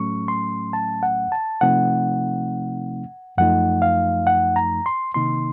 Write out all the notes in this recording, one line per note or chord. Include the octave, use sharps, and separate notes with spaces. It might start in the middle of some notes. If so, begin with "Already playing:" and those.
Already playing: A2 F#3 A3 C#4 C#6
C6
A5
F#5
A5
C3 F3 A3 C4 D#4 F#5
F#2 F3 A3 D#4 F#5
F5
F#5
A#5
C6
C3 D#3 A#3 D#4 C6